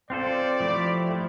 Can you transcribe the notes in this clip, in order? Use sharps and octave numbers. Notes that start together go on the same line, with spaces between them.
C4 F4 A4 C5 D5
F3 A3 E4 G4
F3 A3 E4